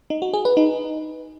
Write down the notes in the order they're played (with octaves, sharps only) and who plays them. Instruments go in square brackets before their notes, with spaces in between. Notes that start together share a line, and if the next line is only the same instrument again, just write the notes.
[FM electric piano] D#4
F#4
G#4
B4
D#4